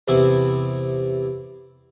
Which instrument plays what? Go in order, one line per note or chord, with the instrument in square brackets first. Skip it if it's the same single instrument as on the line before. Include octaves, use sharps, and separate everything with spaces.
[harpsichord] E2 C3 E4